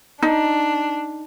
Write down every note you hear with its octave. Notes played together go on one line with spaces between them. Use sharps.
D4 D#4